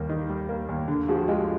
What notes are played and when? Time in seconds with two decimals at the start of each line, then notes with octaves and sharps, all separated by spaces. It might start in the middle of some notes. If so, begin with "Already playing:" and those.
Already playing: D#2 G3 A#3
0.09 D#3
0.29 G3
0.49 A#3
0.69 D#2
0.88 D3
1.08 F3 F#4 G#4
1.28 G#3 F4 G4